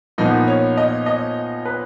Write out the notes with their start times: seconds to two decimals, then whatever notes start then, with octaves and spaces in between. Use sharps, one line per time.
0.18 A#2 F3 B3 D#4
0.48 C#5
0.77 D#5
1.06 D#5
1.65 B4